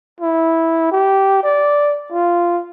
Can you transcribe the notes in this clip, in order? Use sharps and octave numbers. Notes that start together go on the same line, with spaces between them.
E4
G4
D5
F4